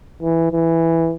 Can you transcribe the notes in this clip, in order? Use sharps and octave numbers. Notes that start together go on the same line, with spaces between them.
E3
E3